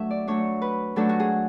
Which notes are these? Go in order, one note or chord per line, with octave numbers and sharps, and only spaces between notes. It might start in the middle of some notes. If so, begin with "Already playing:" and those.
Already playing: F#3 A3 D4 B4 E5
D5
F#3 A3 D4 C#5
B4
F#3 A3 D4 A4
F#4
G#4